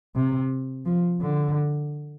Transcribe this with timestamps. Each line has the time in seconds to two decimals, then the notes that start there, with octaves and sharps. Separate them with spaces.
0.16 C3
0.86 F3
1.21 D3